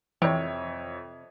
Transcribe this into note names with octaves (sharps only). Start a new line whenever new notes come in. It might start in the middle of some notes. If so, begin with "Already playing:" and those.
F2 C3 E3 C#5